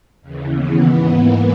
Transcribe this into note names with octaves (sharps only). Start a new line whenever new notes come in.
D#2 C#3 E3
B3
G#2 E3
A#3